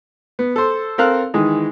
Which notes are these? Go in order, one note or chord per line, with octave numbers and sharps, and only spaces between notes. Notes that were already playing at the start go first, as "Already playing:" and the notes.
B3
A4 C5
C4 A4 A#4 F5 F#6
D#3 E3 G#3